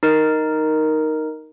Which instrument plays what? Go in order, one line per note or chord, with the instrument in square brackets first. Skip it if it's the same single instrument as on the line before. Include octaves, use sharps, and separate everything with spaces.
[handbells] D#4 A#4